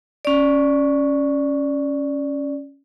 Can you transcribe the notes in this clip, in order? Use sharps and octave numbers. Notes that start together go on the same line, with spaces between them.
C#4 D5